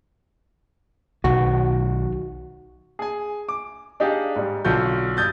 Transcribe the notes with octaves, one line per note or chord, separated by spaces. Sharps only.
B1 D#3 F#4
G#4 G#5
D6
D4 D#4 G4 G#4 F5
G#2 G3
B1 D3 F4 F#4 G6
G2 D#6 G6 A6